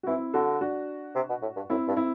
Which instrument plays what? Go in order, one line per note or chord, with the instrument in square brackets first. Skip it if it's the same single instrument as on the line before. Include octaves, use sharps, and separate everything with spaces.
[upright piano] F#4
[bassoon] E3 [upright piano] C4 E4
[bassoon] D3 [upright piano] F#4 A4
[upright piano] D4 F#4
[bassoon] C3
B2
A2
G2
[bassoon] F#2 [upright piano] C4 E4
[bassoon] G2
[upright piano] C4 E4